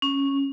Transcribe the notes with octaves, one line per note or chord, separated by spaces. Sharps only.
C#4